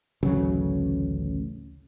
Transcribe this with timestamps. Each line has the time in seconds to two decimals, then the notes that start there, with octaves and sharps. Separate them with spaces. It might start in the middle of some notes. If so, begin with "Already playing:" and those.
0.23 A1 D2 C#3 F#3